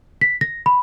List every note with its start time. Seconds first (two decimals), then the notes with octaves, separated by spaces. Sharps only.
0.21 B6
0.41 A#6
0.66 B5